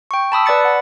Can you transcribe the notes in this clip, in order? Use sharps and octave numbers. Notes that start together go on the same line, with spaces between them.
G5 C#6
A5 B5 D#6 E6
B4 D5 B5 A6 C#7
F#5